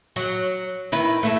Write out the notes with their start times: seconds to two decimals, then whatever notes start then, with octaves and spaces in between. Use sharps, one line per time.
0.16 F#3
0.92 D#3 E4 B4
1.23 A3 E4 A4